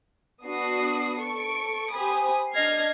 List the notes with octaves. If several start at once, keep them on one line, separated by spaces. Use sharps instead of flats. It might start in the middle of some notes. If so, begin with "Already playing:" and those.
B3 D4 F#4 D#6 C7
A4 C#6 D7
G4 C5 G#5 B5 D#6
D4 D#5 F6 G#6 A#6 C7